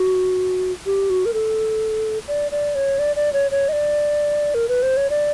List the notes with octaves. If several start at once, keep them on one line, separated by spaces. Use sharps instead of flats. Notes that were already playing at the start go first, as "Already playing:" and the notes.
Already playing: F#4
G4
F#4
A#4
A4
D5
D5
C#5
D5
D5
C#5
C#5
D#5
D5
A#4
B4
C5
C#5
D5